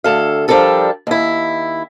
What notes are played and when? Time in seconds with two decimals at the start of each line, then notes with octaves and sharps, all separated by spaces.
0.04 D2 A4 F5
0.48 F3 G3 D4 G4 A4 A#4
1.07 D#2 E4